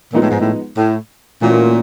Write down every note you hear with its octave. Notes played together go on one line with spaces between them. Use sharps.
A#2 F3 G#3 B3 D#4
A2
G#2
A2
A2
A#2 E3 A3 C#4 F#4